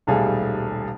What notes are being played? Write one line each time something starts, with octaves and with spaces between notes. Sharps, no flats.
D#1 B1 G3 A3 G#4 F5